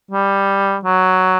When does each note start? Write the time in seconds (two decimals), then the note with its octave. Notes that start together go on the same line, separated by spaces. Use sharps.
0.11 G3
0.84 F#3